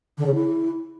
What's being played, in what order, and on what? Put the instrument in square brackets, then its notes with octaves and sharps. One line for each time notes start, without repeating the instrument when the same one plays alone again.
[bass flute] D3
C#3
E4